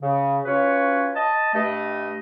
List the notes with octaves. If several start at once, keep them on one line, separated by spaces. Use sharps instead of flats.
C#3
C#4 F4 F#4 B4 C#5
D#5 A5
G2 A3 D#5